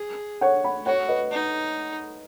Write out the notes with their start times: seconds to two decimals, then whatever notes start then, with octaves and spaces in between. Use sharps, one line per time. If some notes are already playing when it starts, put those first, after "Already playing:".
Already playing: G#4
0.41 C#5 F#5
0.64 F#5 B5
0.86 F#4 C#5 F#5
1.08 B4 D#5
1.31 D#4